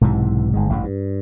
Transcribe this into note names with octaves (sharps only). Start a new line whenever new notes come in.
B1 G#2 C3 E3
G1 G#2 G#3
A1 G2 C#3
G2